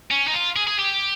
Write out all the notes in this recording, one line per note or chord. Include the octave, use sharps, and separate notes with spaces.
C#4
D#4
F4
G#4
G#4
G4